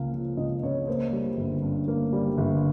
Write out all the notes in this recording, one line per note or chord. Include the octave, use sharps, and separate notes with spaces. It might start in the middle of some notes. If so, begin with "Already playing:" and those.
Already playing: C#2 C#3 A#3 F5
F3
C#2 D#5
C#3 C#5
A#3 C5
G3
G1
G2
A#3
G3
G1